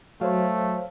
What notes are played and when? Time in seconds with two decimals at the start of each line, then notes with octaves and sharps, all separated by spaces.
0.21 F#3 A3 C5 C#5 F5